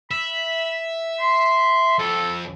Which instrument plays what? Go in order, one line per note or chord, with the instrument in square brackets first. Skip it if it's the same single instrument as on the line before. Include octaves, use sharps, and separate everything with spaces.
[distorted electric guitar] E5 [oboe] B5
[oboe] C6
[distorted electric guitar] F2 [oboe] A4